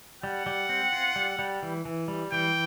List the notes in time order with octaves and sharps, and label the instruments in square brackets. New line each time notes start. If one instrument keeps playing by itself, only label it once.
[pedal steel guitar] G3 [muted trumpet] F#5
[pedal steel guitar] G3
C4
F4
G3
G3
E3
E3
G3
[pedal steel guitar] E3 [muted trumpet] G5